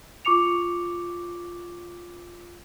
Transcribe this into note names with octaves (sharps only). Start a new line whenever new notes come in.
F4 C#6 D6 C#7 F7